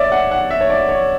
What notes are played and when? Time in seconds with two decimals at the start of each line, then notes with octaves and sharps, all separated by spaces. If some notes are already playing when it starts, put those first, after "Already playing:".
Already playing: C#5 D5 E5
0.12 F#5
0.31 F#5
0.50 E5
0.61 C#5
0.70 D5
0.89 C#5